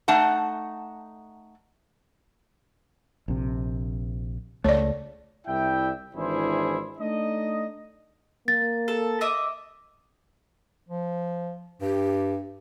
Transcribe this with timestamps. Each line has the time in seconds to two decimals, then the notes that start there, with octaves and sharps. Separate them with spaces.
0.08 A3 D#4 F#5 A5
3.28 A#1 C3
4.64 C#2 A3 C#5 D5
5.47 C2 E4 D5 E5 G5
6.15 G#1 E3 D4 E4 G#4 C5
6.99 A3 D4 D#4 D#5
8.48 A#3 A6
8.88 A4
9.21 D#5 E5 D6
10.89 F3
11.81 G2 G4